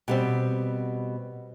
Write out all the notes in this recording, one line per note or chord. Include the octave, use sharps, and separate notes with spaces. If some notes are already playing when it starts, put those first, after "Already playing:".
B2 G3 C4